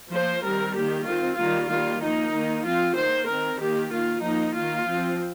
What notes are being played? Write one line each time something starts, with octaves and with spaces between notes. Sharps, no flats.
F3 A#3 C5
D#3 G3 C4 A#4
D#3 A#3 G4
D#3 C4 F4
D#3 G3 A#3 F4
D#3 G3 A#3 F4
F3 A#3 D#4
D#3 A#3
F3 C4 F4
D#3 A#3 C5
D#3 C4 A#4
D#3 A#3 G4
D#3 A#3 F4
F3 A#3 D#4
D#3 A#3 F4
F3 C4